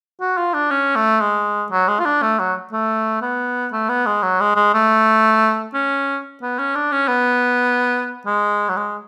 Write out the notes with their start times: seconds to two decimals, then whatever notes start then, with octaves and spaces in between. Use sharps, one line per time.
0.21 F#4
0.37 F4
0.54 D4
0.71 C#4
0.96 A3
1.21 G#3
1.72 F#3
1.88 G#3
2.00 F4
2.05 D4
2.22 A3
2.39 F#3
2.72 A3
3.22 B3
3.72 A3
3.89 B3
4.06 G#3
4.23 F#3
4.40 G#3
4.56 G#3
4.74 A3
5.74 C#4
6.42 B3
6.59 C#4
6.75 D4
6.92 C#4
7.08 B3
8.26 G#3
8.69 F#3
8.77 G#3